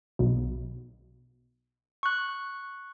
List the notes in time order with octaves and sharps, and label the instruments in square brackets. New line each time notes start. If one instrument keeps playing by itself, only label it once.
[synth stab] B1 B2
[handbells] C#6 F#6